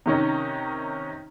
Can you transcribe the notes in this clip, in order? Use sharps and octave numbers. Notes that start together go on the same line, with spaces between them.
C3 D#3 C#4 D#4